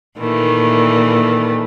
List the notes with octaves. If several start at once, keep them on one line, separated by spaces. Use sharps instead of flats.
A#2 D#3 E3 A3